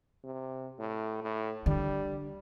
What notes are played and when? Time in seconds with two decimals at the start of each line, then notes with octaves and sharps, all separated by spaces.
0.24 C3
0.79 A2
1.22 A2
1.66 D3 G3